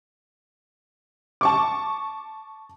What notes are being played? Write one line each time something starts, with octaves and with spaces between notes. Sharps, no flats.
A5 C#6 D6